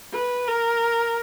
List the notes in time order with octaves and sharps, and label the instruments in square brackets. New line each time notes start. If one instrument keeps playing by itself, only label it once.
[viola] B4
A#4